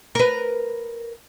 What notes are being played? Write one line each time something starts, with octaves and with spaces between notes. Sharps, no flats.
A#4 B4